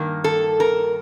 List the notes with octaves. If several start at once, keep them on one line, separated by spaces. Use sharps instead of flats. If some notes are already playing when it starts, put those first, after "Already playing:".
Already playing: G2 D#3 A#3
A4
A#4